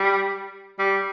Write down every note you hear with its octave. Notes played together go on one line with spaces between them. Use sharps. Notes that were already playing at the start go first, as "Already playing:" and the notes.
Already playing: G3
G3